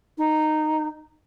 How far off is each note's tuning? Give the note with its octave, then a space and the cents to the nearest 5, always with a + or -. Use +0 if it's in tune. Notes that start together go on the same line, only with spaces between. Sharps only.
D#4 -10